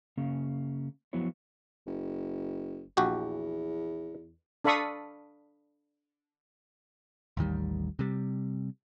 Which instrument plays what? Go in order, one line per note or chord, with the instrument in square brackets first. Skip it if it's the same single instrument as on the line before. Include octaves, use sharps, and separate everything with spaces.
[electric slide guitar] C#3 A#3 C#4
F3 F#3 B3 E4 C#5
[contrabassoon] F#1
[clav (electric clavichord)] A#1 F#4 G4 [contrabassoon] E2
[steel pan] D4 A4 F5 B5 C#6 D#6
[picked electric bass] A1 D#2 D#3 G3
C3 G3